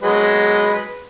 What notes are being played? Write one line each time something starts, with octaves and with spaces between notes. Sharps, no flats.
F#3 G#3 B4